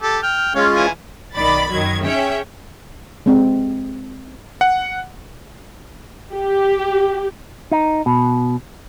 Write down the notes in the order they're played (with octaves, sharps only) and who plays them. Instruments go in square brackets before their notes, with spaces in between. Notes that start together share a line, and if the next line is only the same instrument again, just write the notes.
[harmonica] G4 A4
G5 F6
[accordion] G#3 C#4 F4 [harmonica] C#5 F5
[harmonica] E3 G#5
[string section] B1 D#3 D5 B5 A6
F#2 D#3 F#3 G#6
C#4 G#4 C#5 E5 G5
[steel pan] G#3 C4
[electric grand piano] F#5
[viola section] G4
[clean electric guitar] D#4
B2